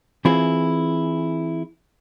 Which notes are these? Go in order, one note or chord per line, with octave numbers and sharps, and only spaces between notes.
E3 C4 E4 F4 G#4